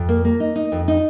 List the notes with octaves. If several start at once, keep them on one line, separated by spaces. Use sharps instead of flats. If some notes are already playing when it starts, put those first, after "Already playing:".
Already playing: F2
A#3
A#3
D#4
D#4
F2
D#4